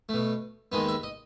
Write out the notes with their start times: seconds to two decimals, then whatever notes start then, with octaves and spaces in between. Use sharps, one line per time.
0.09 B2 A3
0.72 D#2 D#3 G#3 B3 D#5
0.88 E5
1.03 D#5